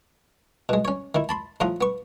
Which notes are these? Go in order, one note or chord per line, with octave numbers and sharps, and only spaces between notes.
B2 G#3
C#4 C#5
D#3 E4
A5 B5 C6
A2 F3 F#5 A#5 C6 D#6
B3 C#6